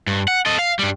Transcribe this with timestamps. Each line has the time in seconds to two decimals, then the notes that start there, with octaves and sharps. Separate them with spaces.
0.07 G2
0.28 F#5
0.46 A4 D#5
0.59 F5
0.79 G2 G3